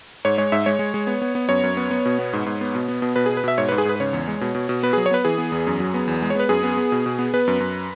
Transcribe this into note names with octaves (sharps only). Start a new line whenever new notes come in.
G#2 C#5
G#3 C#5
G#2 E5
G#3 C#5
G#3
G#3
B3
B3
B3
F#2 C#5
F#2
B3
B3
B2
B3
G#2
G#2
B3
B2
B3
B2
B2 B4
B2 G#4
B4
B2 E5
G#2 C#5
G#2 B4
G#4
G#2 B4
B4
C#3 C#5
E2
G#3
B2
B2
B2
B3 B4
F#3 G#4
C#5
B3 B4
E3 G#4
B3
E2
F#2
F#3
B3
E2
G#3
C#5
B3 B4
F#2 G#4
B3
B3
B2
B2
B3
B3 B4
F#2
F#2